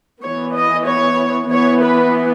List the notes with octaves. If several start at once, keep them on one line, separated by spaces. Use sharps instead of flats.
E3 B3 C#5
D#5
C#5
E3 B3 C#5
B4